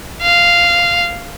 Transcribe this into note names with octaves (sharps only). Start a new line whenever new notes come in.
F5